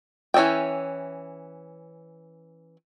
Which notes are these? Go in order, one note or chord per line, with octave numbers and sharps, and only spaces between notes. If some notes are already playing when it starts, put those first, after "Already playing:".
E3 C#4 D#5 E5 G5